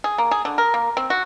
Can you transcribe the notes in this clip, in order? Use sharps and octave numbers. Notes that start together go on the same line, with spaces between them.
G#4
A#3
G#4
D3
A#4
A#3
C4
F#4